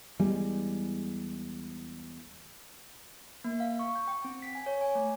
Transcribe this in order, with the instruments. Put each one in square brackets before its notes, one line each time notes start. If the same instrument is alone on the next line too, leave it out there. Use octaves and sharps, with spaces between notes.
[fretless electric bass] E2 G3 G#3
[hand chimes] A#3
F5
C#6
G6
G5
C4
B6
G#5
C#5
G#5
A3